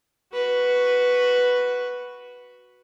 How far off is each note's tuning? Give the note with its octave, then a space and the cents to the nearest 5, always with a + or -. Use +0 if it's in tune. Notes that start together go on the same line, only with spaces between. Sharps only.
F#4 +0 B4 +0